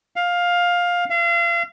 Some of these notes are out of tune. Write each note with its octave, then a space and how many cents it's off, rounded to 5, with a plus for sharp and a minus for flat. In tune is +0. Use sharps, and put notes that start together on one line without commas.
F5 +15
F5 -35